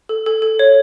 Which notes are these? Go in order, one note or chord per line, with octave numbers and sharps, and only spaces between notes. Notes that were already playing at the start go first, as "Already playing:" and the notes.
A4
A4
A4
C#5